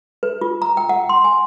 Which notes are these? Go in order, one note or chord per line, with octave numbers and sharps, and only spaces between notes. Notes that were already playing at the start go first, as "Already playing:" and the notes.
B4
F4
A#5
G5
F#5
C6
G#5